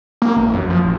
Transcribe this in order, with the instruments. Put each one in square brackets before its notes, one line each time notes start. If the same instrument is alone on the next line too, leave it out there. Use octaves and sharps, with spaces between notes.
[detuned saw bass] A#3
A1
F#2
F3
A1